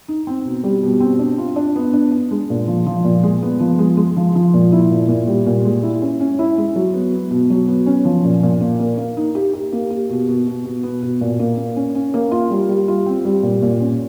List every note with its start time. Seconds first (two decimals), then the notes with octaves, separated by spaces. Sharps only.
0.08 D#4
0.27 C4
0.45 B2
0.64 G3
0.83 B2
1.00 C4
1.19 D4
1.38 F4
1.56 D4
1.76 B3
1.93 D4
2.12 D4
2.31 G#3
2.50 A#2
2.68 F3
2.86 F3
3.04 A#2
3.23 G#3
3.42 B3
3.60 F3
3.79 G#3
3.97 G#3
4.16 F3
4.35 F3
4.54 A#2
4.72 E4
4.91 A#2
5.08 A#2
5.27 G3
5.46 A#2
5.65 G#3
5.83 E4
6.02 C#4
6.20 C#4
6.39 E4
6.58 G#3
6.76 F#3
6.94 B3
7.12 B3
7.31 B2
7.50 F#3
7.68 B3
7.86 C#4
8.05 F3
8.25 A#2
8.43 A#2
8.61 A#3
8.80 A#3
8.98 A#3
9.17 D#4
9.35 G4
9.53 G4
9.72 A#3
9.90 G4
10.10 B2
10.28 B2
10.47 B2
10.65 B2
10.83 B3
11.02 B2
11.21 A#2
11.39 A#3
11.57 A#3
11.76 C#4
11.95 C#4
12.14 A#3
12.31 F4
12.50 G3
12.69 G3
12.88 F4
13.06 C4
13.25 G3
13.43 A#2
13.62 A#2
13.81 C#4